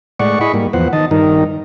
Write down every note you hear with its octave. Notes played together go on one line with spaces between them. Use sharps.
A2 G#3 D5 F#5 C#6
E4 G#4 D#5 B5 C#6
G#2 G3 A#3
E2 F3 B3 C5 F#5
D#3 D#5 A5
G2 D#3 D#4 A#4